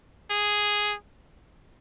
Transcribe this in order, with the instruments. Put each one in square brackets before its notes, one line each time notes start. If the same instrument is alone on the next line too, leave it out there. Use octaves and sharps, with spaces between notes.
[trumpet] G#4